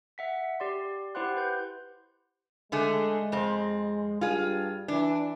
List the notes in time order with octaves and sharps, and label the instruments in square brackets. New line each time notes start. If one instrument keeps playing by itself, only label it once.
[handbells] E5 F#5 B6
G4 D5 C6
E4 G4 C5 F#5 C6 F#6
B4 G6
[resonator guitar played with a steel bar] D3 A3 G#4 [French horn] G#3
[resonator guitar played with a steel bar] F2 C4
[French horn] G2 [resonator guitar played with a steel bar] F4 G#4
[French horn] E3 [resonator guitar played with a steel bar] D4